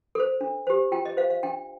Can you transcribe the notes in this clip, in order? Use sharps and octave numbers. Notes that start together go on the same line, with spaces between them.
A4 C5
D4
G4 C5
F4 G5
D#5
C5 F5
F5
D4 G5